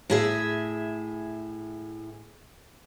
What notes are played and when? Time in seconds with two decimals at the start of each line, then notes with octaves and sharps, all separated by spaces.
0.10 A2 G#4 E5